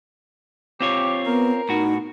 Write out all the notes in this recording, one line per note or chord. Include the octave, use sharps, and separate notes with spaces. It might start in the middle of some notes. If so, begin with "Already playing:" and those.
C4 F4 G4 C#5
B3 A#4
A2 D#4 F#4